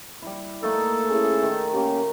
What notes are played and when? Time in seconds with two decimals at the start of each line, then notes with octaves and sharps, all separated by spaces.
0.22 G3 E4
0.63 A3 A#3 D#4 A4
1.10 C#4 E4 G#4
1.43 D#3
1.72 A#3 C#4 G4